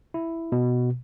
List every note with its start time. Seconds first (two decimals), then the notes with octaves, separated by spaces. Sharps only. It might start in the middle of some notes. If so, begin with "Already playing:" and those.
0.14 E4
0.52 B2